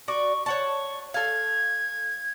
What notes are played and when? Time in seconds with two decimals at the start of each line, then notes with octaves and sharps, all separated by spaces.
0.08 F#4 D5 C#6
0.46 C#5 F#5 A5 C#6
1.14 A4 F5 G#6